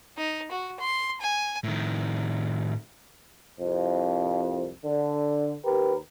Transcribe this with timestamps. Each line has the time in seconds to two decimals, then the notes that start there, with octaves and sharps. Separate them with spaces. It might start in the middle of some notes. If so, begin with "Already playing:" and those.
0.18 D#4
0.51 F#4
0.80 C6
1.21 G#5
1.64 A2 D#3
3.60 C2 F2
4.85 D3
5.66 D#2 G4 A#4 B4